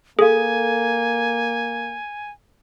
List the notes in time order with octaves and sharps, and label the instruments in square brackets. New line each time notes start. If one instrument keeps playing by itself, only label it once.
[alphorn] A#3 [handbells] G#4 [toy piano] A4 F5 [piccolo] G#5